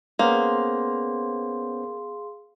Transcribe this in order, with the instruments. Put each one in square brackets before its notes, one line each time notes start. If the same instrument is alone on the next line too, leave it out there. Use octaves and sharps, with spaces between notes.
[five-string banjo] A#3 [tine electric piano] B3 C#4 C5 [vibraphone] G#4 F5 C6